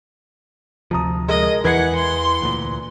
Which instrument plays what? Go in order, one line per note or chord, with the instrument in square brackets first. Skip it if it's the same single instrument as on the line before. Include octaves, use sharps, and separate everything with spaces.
[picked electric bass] D2 C3 F3 [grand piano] A5 A#5 D#6
[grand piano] G#3 G#4 A#4 [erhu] D#5
[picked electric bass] E2 [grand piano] E3 C#7 [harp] B4 G#6 C7 [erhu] F#5
[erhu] C6
[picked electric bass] D2 A#2